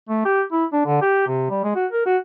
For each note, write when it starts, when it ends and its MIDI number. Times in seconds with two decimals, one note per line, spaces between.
0.09 0.21 57
0.25 0.42 67
0.52 0.65 64
0.73 0.83 62
0.86 0.99 50
1.02 1.25 67
1.27 1.49 48
1.50 1.61 55
1.64 1.75 56
1.75 1.86 66
1.92 2.06 70
2.06 2.17 66